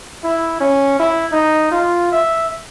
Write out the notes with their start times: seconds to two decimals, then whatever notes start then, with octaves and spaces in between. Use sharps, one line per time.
0.24 E4
0.60 C#4
0.99 E4
1.32 D#4
1.71 F4
2.12 E5